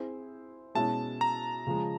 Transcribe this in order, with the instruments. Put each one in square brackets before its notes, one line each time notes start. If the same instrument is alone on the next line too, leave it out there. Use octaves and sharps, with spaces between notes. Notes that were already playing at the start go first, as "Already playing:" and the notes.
Already playing: [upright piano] C4 E4 G#4 C5
[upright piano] B2 G#3 C#4 E4 [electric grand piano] A5
[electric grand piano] A#5
[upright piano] C#3 F3 G#3